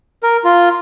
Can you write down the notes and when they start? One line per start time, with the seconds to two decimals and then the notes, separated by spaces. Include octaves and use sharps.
0.23 A#4
0.45 F4